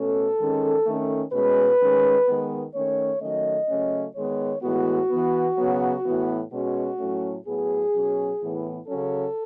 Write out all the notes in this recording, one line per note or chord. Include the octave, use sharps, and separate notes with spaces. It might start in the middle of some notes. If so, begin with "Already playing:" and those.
Already playing: B2 A3 C#4 A4
D#3 G#3 C#4
D#3 A3 C#4
B2 G#3 C#4 B4
D#3 G#3 C#4
D#3 G#3 B3
D#3 A3 C#4 C#5
D#3 F#3 A3 C#4 D#5
C#3 F#3 A3 C#4
D#3 G#3 B3 C#5
A2 E3 G#3 B3 F#4
E3 B3
C#3 F#3 B3
A2 E3 B3
B2 G#3 C#4 F#4
A2 F#3 A3 C#4
A2 F#3 B3 G#4
B2 F#3 C#4
A2 E3 B3
C#3 F#3 C#4 A4